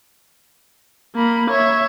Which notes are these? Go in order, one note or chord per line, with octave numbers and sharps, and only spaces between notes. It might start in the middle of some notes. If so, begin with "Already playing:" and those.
A#3 B5
C#5 E5